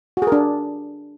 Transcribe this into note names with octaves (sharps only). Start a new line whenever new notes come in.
F#4
G#4
A#4
D4